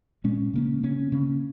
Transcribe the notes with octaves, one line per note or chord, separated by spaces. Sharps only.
A#2 G#3 C#4
C#3 A#3 C#4
C#3 A#3 C#4
C#3 A#3 C#4